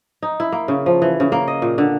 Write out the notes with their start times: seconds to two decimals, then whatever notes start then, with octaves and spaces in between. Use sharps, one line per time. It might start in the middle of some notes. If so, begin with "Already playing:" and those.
0.22 D#4
0.40 E4
0.52 A#3
0.68 C#3
0.86 F3
1.02 E3
1.20 C#3
1.32 A#3
1.48 D#5
1.62 A#2
1.78 D3